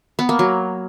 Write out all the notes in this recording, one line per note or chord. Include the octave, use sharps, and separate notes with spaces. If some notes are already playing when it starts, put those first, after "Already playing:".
B3
A#3
F#3